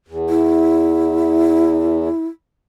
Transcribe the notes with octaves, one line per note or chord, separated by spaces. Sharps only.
E2
E4